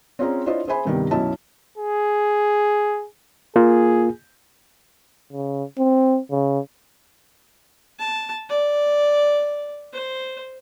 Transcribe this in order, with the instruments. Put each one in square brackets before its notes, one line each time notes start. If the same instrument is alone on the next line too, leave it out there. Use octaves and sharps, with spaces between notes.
[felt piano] C4 C#4 F4 G#4 D5 A#5
D4 E4 F4 C5 C#5 D#5
G#4 C5 E5 G#5 B5
G2 C3 D#3 G3 B3 G4
B1 F#2 C#4 E4 D#5 A5
[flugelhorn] G#4
[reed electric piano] A#3 F4 [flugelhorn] G#4
[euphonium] C#3
C4
C#3
[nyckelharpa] A5
D5
C5